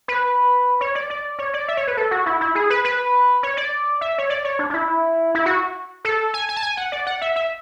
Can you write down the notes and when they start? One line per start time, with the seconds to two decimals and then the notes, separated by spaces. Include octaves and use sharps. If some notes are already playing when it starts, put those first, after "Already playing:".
0.08 B4
0.81 C#5
0.95 D5
1.10 D5
1.39 C#5
1.54 D5
1.68 E5
1.77 C#5
1.87 B4
1.97 A4
2.11 F#4
2.26 E4
2.41 E4
2.55 G#4
2.70 B4
2.84 B4
3.43 C#5
3.57 D5
4.01 E5
4.18 C#5
4.30 D5
4.45 C#5
4.59 D4
4.70 D4
4.74 E4
5.35 E4
5.46 F#4
6.05 A4
6.34 G#5
6.49 G#5
6.56 A5
6.62 G#5
6.77 F#5
6.92 D5
7.07 F#5
7.21 E5
7.36 E5